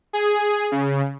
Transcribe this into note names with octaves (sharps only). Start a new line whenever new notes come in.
G#4
C#3